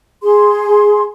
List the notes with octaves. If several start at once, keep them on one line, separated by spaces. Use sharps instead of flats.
G#4 C6